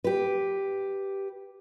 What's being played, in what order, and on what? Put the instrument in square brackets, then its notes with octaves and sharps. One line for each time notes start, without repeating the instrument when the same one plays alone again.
[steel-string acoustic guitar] G4 B4